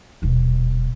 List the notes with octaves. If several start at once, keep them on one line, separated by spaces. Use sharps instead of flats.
D#1 B2